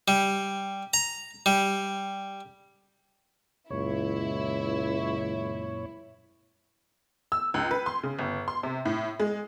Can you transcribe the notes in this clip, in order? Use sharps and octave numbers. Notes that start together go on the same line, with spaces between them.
G3
A#5
G3
C#2 F#2 A#2 E4 C#5
E6
C#2
B4
C6
C#3
G1
C6
C3
A2
G#3